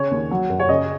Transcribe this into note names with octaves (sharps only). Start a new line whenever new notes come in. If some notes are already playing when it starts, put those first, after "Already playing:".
Already playing: C#3 C#5
D#2
F#3
F#2
C#5
C#3 D#5